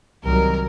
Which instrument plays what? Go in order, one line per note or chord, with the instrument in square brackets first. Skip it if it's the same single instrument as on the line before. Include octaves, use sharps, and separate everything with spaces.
[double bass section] C2 C3 D#3 F#3 [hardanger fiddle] A#4